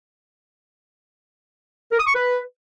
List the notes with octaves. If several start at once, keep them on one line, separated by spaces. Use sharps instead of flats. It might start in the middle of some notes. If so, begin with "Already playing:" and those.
A#4
D#6
C#6
B4